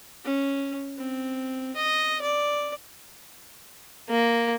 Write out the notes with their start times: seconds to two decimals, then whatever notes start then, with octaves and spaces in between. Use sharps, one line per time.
0.24 C#4
0.97 C4
1.76 D#5
2.21 D5
4.09 A#3